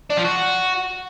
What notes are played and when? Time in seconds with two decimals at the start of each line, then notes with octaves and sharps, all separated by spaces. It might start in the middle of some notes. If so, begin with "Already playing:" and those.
0.10 D4
0.17 F3
0.24 F#4